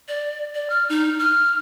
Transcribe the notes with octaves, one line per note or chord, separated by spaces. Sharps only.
D5
D5
F6
D#4
F6